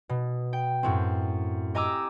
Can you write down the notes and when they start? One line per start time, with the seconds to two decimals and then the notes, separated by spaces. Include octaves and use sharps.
0.09 B2
0.53 G5
0.83 F#2 A2 C4
1.75 G4 D#5 G#5 A#5 D6 E6